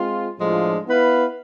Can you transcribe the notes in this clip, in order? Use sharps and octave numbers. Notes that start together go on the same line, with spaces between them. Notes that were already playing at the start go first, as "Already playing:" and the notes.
Already playing: G#3 C4 F4
A2 F3 G#3 D4 F4
B3 E4 B4 F5